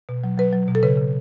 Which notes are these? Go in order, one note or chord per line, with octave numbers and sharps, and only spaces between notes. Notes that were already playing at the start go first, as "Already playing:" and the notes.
B2
F#3
F#3 B4
F#3
B2
A4
C#3 B4
C#3